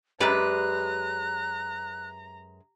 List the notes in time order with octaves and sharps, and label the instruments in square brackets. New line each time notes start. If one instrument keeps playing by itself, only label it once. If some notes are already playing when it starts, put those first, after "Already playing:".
[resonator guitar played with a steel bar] F#2 G#3 B4 [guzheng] G4 D5 [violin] A#5 [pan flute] F#6